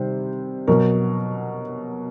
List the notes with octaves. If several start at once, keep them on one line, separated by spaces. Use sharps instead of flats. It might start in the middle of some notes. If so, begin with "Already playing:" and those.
Already playing: C3 D#3 G3 C5
B2 F#3 A#4